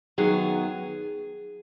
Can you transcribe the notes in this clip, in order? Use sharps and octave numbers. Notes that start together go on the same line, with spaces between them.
F#2 D#3 F#3 B3 G#4